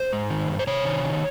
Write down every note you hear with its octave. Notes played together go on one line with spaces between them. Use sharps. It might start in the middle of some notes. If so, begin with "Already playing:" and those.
Already playing: C5
G#2
D#3
G2
C5
C3 C#5
D#3
D#3